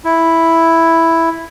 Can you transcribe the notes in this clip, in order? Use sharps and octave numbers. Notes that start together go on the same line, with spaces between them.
E4